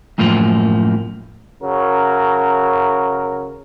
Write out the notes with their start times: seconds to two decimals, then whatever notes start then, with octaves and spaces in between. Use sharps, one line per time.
0.18 F#2 A2 F3 A#3
1.63 C#3 F#3 A#4